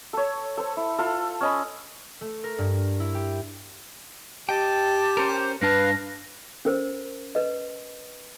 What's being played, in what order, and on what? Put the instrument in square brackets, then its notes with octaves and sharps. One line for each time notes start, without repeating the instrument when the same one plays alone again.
[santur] A4 C#5
A4 C5
E4
F4 A4
C#4 D#5 B5
[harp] A3
A#4
G2
E4
G4
[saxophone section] G4 [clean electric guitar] D#5 G5 [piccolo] A5
[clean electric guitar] C#4 A#4 [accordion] C5
[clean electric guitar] G2 D4 A5 [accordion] B4 F5 [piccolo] A#6
[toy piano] C#4 A#4 C5
B4 D#5